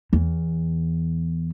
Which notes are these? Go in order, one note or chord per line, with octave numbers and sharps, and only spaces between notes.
E2